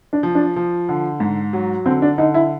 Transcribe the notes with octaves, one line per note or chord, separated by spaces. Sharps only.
D4
F3
D4
F3
D3
G#2
F#3
D3 C4
D4
D3 D#4
E4